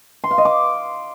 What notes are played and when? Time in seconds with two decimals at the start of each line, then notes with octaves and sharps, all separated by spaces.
0.24 C6
0.31 F5
0.38 D#5
0.45 D6